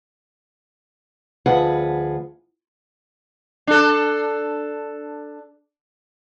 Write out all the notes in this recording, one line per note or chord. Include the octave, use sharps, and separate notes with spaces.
D2 F3 G#4 B4 F#5
D4 A4